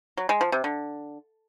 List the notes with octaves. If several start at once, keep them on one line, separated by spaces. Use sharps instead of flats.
F#3
G#3
F3
C3
D3